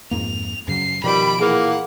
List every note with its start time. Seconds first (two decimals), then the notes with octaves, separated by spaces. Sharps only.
0.11 F2 G#2 A#3 F7
0.68 F#2 C#3 F#3 C7
1.04 B2 D#3 F3 G3 B5 D7
1.40 A#2 E3 A#3 G#4 F#5